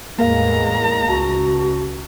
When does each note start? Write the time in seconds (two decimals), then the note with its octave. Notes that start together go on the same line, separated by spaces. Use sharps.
0.18 E2 A2 G#3 A#3 A#4 F5 A#5
1.08 C#2 F#4 A5